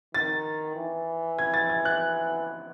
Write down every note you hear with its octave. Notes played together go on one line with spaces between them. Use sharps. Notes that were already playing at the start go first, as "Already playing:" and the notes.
D#3 A6
E3
G#6
A6
G#6
F#6